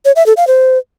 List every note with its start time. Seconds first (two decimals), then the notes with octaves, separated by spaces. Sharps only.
0.05 C#5
0.16 E5
0.26 A4
0.37 F5
0.47 C5